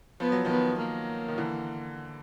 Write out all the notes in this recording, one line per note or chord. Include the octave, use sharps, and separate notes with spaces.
F3 B3
F#3
D#3 F3 B3
A#3
D#3
D3 E3